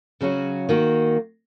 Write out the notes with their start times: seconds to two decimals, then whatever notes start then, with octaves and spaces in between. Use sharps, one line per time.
0.21 C#3 F#3 C#4 F#4
0.69 D#3 A#3 D#4 F#4